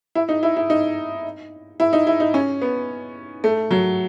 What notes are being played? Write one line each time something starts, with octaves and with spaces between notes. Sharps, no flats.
E4
D#4
E4
E4
D#4
E4
D#4
E4
D#4
C#4
B3
A3
F#3